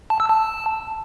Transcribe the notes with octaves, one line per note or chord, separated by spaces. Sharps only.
A5
E6
A5